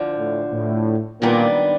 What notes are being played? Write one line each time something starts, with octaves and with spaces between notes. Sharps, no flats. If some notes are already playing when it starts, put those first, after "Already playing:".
Already playing: D2 D3 F3
A2
A2
F#2 A#2 D#3 G3 B3 D4